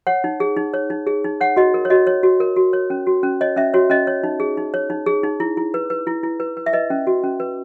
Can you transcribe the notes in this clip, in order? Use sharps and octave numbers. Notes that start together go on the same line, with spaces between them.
C#5 F#5
D#4
G#4
D#4
C#5
D#4
G#4
D#4
C#5 F#5
F#4 D#5
A#4
C#5
F#4 D#5
C#5
F#4
A#4
F#4
C#5
C#4
F#4
C#4
C#5 D#5
C#4 E5
F#4 C#5
C#4 D#5
C#5
D#4
G#4
D#4
C#5
D#4
G#4
D#4
E4
E4
B4
B4
E4
E4
B4
B4
E5
B4 D#5
C#4
F#4
C#4
B4